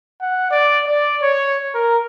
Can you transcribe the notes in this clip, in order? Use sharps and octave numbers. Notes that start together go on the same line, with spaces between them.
F#5
D5
D5
C#5
A#4